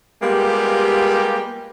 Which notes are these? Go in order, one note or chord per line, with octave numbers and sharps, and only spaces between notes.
G3 G#3 A#3 B3 F4 G4